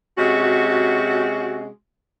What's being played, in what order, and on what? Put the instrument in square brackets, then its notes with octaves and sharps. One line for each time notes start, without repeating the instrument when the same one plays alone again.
[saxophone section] C3 G#3 C#4 F#4